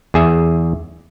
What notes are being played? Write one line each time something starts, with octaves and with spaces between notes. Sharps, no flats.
E2 G#4 E5